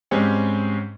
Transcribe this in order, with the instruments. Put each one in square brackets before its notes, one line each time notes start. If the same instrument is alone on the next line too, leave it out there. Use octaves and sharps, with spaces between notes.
[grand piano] G#2 G3 G#3 C4 C#4 G4